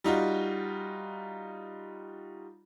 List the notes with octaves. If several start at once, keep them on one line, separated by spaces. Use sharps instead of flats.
G3 D#4 F4 F#4